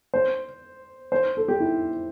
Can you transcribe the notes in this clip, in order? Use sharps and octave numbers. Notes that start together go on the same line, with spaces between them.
C5
C5
A4
G4
E4